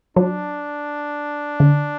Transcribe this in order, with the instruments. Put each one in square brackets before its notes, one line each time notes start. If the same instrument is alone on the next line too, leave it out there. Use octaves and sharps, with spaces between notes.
[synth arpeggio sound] F#3 [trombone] D4
[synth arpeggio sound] D3